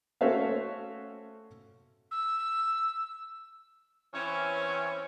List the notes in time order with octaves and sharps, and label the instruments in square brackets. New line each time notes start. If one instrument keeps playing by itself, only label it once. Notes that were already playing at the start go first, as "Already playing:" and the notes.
[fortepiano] A3 C#4 F#4 C5 E5 F5
[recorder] E6
[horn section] E3 C4 C#4